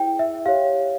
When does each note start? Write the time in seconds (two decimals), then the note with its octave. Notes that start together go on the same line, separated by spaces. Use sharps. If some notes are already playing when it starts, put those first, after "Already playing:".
Already playing: E4 G#4 C5 G5
0.19 E5
0.46 G4 C#5 F5